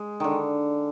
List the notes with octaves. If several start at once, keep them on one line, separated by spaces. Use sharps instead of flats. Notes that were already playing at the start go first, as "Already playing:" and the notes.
Already playing: G#3
D3 D#3